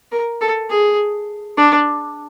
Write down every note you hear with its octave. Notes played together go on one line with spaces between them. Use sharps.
A#4
A4
G#4
D4